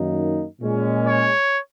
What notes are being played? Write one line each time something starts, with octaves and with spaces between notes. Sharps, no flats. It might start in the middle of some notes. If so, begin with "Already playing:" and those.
Already playing: F#2 D#3 A#3 D#4
A#2 G#3 C#4
C#5